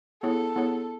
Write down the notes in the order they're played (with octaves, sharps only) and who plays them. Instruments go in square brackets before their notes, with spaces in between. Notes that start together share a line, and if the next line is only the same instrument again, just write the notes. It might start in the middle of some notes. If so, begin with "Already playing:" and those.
[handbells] B3 E4 G#4 C#5 F#5 [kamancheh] A4
[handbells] B3 E4 G#4 C#5 F#5